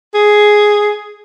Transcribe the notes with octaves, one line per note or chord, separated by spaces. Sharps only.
G#4